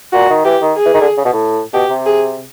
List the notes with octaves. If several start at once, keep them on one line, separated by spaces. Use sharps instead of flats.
A#2 F#4
D#3
E3 G4
D#3
G#4
E3
D#3
D3
C#3
B2
A2
B2 G4
C3
G#4